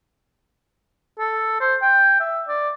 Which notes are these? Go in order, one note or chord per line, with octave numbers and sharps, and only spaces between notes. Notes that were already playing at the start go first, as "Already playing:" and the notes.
A4
C5
G5
E5
D5